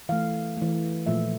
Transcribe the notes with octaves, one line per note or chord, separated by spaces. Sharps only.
E3 A3 F5
E3 A3
A#2 F3 A3 E5